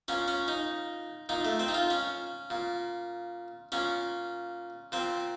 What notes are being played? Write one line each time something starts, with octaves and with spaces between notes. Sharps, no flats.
A#2 C#4
C#4
D#4
A#2 D#4
A3
C4
D#4
F4
C#4
A#2
A#2 C#4
A#2 C4